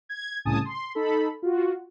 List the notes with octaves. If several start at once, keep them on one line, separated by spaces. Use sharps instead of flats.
G#6
C2 A2 C#3 G#5 A5 D#6
C6
D#4 A4 B5
F4 F#4